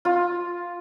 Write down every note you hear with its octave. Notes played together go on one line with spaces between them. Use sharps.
F4